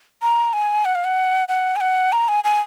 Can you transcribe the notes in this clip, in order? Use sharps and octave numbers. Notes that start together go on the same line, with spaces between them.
A#5
G#5
F#5
F5
F#5
F#5
G#5
F#5
A#5
G#5
G#5